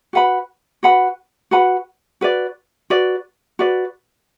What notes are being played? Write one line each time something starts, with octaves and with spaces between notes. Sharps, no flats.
F#4 B4 F#5 B5
F#4 B4 F#5 B5
F#4 B4 F#5 B5
F#4 B4 D5
F#4 B4 D5
F#4 B4 D5